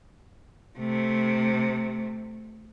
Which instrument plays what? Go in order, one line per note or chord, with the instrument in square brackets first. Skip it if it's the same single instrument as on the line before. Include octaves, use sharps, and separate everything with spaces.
[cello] C3 A3